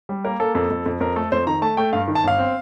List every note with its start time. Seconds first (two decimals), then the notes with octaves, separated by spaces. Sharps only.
0.09 G3
0.25 A#3 A#4
0.40 A#3 A4
0.55 F2 A4
0.70 F2
0.86 F2
1.00 F2 A#4
1.16 A3 A4
1.32 F2 C5
1.47 D#3 A#5
1.62 A3 A5
1.77 A3 G5
1.93 G2 F5
2.08 D#3
2.15 A5
2.23 G1 F5
2.38 C4